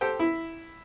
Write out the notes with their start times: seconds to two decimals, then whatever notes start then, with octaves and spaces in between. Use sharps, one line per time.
0.01 G4 A4 C5 G5
0.20 E4